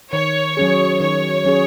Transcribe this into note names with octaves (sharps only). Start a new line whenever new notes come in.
D#3 C#5
F#3 C#4 G#4
D#3 C#5
F#3 C#4 G#4